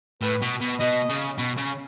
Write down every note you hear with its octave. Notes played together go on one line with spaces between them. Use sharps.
A2 B4
B2
B2
B2 D#5
C#3
B2
C#3